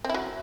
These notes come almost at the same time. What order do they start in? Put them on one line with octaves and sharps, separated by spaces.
C4 E4 F#3